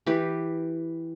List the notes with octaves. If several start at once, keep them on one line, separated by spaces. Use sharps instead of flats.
E3 G4 B4